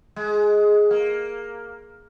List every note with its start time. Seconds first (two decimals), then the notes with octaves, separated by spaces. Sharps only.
0.16 G#3
0.91 A#3